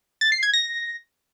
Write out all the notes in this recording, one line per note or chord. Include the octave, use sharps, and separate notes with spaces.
A6
C7
G#6
A#6